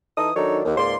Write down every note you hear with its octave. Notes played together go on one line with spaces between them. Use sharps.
E3 D#4 A4 D#6
D#3 F#3 D4 D#4 A4 C#5
D#2
C#2 G#2 A#3 D5 C6